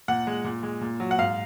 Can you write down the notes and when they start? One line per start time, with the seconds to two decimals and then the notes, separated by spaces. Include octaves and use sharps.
0.08 A#2 F#5
0.27 G#3
0.44 A#2
0.63 G#3
0.81 A#2
1.00 F#3
1.11 F#5
1.18 G#2 F5